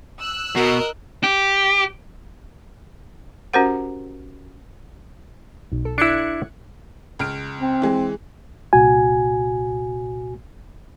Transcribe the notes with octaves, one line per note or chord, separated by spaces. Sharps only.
E6 F#6
B2 F#4 A#4 D#5
G4
C#4 F#4 G4 A#4 C5 F#5
B1
A4
D4 E4 F#6 G#6 C#7
C#2 F6 D7
C4
E3 G#3
C2 A#2 F#4 G#5